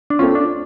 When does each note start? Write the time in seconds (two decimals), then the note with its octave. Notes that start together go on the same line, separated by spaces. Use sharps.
0.10 D4
0.19 A3 C4 C#4 F4
0.35 D4